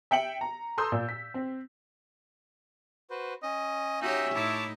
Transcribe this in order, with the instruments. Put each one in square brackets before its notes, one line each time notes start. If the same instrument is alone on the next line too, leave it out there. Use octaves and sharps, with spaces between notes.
[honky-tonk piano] E5 G5 C#7 F#7
A#5
A4 A#5 C6 D#6 E6 G6
A#2
B6
C4
[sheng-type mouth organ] F#4 B4 C5
[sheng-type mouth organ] C#4 [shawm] D#5
[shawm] D#4 [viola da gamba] F#4 G4 C#5 [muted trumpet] E5
[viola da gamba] A2 D#4 [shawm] E4 [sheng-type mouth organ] C#5 A5 D6